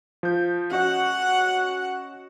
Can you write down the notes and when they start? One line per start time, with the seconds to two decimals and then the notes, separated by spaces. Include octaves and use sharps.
0.23 F3 G6
0.71 C#4 F#4 D#5 F#5